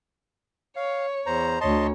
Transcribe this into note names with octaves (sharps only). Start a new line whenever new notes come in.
C#5 F5
E2 C5 A#5
D2 C#5 D#5 A5 C6